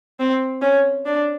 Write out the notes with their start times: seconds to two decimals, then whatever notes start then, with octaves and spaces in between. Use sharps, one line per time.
0.20 C4
0.62 C#4
1.06 D4